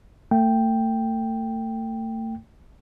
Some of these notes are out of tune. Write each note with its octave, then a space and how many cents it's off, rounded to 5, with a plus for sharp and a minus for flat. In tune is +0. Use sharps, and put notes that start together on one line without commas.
A3 +35 G5 +0